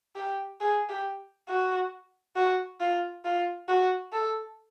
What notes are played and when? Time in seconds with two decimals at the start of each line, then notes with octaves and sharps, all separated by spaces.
0.16 G4
0.61 G#4
0.89 G4
1.49 F#4
2.36 F#4
2.80 F4
3.25 F4
3.69 F#4
4.13 A4